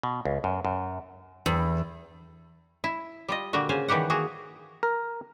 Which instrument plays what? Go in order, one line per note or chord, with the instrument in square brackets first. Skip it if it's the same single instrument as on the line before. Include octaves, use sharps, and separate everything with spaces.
[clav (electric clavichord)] B2
C#2
F#2
F#2
[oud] E2
[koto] E4
G3 F4 D#5
A#2 D3 G3 A#3 F#4
C#3 C5 F5 G#5
D#3 E3 G3 G4 F#5
A#3 F#4 G#4
[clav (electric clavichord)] A#4